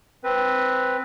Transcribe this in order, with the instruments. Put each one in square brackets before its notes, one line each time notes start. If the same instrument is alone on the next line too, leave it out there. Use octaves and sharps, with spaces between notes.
[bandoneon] C4 B4